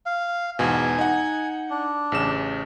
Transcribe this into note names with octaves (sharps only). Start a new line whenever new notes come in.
F5
E2 G#2 B2 G#5
D#4 F#5
D4
A1 C#3 E7